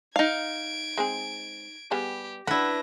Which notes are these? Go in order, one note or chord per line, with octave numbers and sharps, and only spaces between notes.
D#4 F5 G#6 D7
G#3 C4 G#4
G3 B3 G4 G#4
D4 E4 F#4 B4 A#6